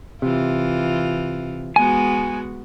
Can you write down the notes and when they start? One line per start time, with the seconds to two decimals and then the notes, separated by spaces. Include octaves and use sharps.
0.22 C3 E3 F4
1.76 G#3 B3 F#4 G#5